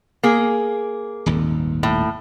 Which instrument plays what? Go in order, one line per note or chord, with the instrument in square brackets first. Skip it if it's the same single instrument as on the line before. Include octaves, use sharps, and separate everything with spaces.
[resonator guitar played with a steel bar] A#3 G#4
[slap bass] D#1 G#1 D#2
[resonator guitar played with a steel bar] A2